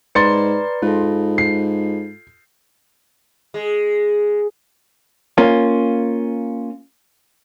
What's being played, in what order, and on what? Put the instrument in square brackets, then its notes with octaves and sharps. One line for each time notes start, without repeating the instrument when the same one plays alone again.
[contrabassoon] G#2 [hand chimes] B4 D5 A#5 [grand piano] C6 A6 C#7
[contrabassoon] G#2 [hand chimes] F4 A4
[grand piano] C7
[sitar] G#3
[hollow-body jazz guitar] A#3 C#4 F4